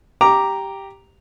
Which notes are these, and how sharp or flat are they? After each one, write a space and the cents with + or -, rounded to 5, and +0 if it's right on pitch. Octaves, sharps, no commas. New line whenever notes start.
G4 +0 A#5 +0 D6 +0